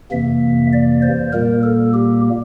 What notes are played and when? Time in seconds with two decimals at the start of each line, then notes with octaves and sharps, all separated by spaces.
0.11 F2 C3 E3 A#3 E5
0.73 D5
1.02 C5
1.33 A#2 G3 A#3 A#4
1.63 A4
1.94 G4